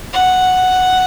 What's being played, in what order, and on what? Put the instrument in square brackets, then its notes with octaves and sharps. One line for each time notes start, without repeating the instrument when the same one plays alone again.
[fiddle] F#5